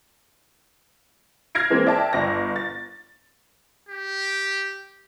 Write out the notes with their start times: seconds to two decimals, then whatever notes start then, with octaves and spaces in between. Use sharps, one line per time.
1.55 F6 G#6 A#6 C7 D7
1.70 E3 G#3 A#3 C4
1.87 D5 E5 G5 A5
2.13 G1 A#6
2.56 A6
3.89 G4